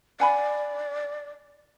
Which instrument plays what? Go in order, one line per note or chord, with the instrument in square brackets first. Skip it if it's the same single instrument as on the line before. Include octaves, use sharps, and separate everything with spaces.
[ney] D5 [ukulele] F#5 G#5 B5